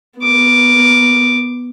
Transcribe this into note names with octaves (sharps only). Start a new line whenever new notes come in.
B3 D6